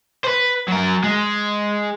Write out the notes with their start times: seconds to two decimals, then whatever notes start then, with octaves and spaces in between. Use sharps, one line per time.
0.24 B4 C5
0.68 F#3 A#4
1.04 G#3